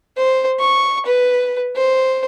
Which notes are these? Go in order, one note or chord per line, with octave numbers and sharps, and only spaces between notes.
C5
C#6
B4
C5